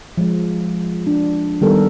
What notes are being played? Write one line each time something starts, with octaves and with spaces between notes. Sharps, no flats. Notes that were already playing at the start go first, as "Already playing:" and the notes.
F3 G#3
D4
D#3 G3 B3 A4 A#4